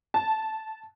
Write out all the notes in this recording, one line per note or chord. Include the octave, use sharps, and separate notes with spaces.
A5